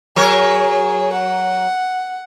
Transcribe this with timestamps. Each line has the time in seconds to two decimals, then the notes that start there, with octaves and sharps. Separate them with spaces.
0.16 F#3 G#4 A#4 C#5
1.12 F#5